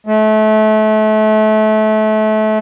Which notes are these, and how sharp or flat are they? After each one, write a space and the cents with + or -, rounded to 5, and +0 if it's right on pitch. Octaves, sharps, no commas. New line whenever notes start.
A3 -30